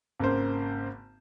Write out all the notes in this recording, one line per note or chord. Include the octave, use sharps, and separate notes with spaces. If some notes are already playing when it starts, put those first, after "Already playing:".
G#1 C#3 A#3 C5